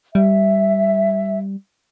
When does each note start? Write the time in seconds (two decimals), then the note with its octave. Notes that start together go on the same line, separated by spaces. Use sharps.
0.15 G3 E5